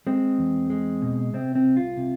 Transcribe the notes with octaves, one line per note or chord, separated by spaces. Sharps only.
G#3 C4
E2
G#3
B2
C3 C4
C4
C2
F4
C3